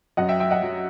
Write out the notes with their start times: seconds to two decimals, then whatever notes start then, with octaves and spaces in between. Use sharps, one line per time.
0.17 F#2 F#3 D#5 F#5
0.29 E5 G5
0.40 E5 G5
0.51 D#5 F#5
0.62 F#3